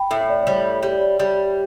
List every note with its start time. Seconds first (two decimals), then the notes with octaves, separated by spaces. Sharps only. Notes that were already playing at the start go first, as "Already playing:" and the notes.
Already playing: G5 B5
0.11 A2 E5
0.21 E5
0.29 D5
0.43 D5
0.47 G3 C#5
0.65 D5
0.83 G3 C#5
1.01 D5
1.19 G3